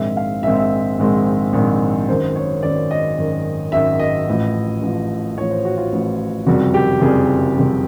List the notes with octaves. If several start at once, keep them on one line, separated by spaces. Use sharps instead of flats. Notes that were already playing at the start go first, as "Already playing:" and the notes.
Already playing: A#1 G#2 D#3 G#3 C4 E5
F5
A#1 G#2 D#3 G#3 C4 E5
E5
A#1 G#2 D#3 G#3 C4
A#1 G#2 D#3 G#3 C4
G#1 F#2 D#3 C5
C#5
G#1 F#2 D#3 D5
D#5
G#1 F#2 D#3
G#1 F#2 D#3 E5
D#5
A1 A2 F3
A1 A2 F3
A1 A2 F3 C#5
C5
F#4
F4
A1 A2 F3
F#1 F2 C3 D#3 G3 F#4
G4
F#1 F2 C3 D#3 G3 G#4
F#1 F2 C3 D#3 G3